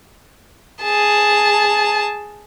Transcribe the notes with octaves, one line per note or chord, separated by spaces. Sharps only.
G#4 A5